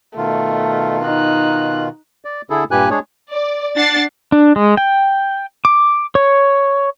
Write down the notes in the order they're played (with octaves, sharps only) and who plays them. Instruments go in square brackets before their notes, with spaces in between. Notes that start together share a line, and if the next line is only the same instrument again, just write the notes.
[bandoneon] B2 D#3 F4 [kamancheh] A3
[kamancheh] D#4 F#6
[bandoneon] D5
D3 E4 G#4 A4
G2 A#2 G4 B4 G#5 F#6
G#3 D4 G#4 C#5
[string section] D5
D4 F#5 A6 C7
[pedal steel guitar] D4
G#3
G5
D6
C#5